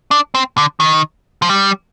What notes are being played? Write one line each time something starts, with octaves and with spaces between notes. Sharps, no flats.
D4
C4
D3
D#3
F3
G3